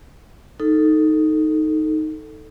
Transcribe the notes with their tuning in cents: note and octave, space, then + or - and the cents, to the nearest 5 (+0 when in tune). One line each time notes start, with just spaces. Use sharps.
D#4 +0 A4 +0